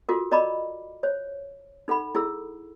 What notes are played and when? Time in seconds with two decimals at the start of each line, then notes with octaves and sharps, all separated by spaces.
0.09 F4 F#4 A4 A#4
0.31 A#4 D5 D#5 A#5 B5 D6
1.03 C5 C#5
1.88 D#4 A4 F#5 B5
2.15 E4 G#4 A4 E6